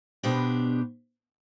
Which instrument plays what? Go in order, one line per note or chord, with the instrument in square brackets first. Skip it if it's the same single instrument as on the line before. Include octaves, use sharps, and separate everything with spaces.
[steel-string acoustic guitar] B2 B3 D4 G4 C5